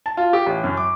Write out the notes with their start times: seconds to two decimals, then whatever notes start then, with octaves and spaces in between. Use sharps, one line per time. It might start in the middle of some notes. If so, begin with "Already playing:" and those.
0.06 A5
0.17 F4
0.33 G4
0.46 A1
0.64 F#2
0.77 D6